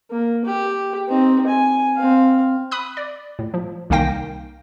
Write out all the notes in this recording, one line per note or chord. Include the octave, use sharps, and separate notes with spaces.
A#3
G4
C4 D#4
G#5
C4 F5
B5 D#6 F#6
D5
A2
F3
C2 D#3 A#3 F5 G5 A#6